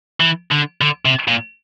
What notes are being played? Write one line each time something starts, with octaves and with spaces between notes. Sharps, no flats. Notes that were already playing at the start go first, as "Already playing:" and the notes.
E3
D3
D3
C3
A#2